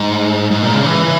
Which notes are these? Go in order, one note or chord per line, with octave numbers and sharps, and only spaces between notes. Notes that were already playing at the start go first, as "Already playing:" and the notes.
Already playing: G#2
G#2
A#2
C#3
E3